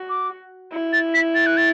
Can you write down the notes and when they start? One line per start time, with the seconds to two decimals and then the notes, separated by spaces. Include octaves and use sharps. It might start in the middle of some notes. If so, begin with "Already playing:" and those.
Already playing: F#4
0.09 D6
0.72 E4
0.93 A6
1.14 B6
1.35 A6
1.46 F#6
1.57 A6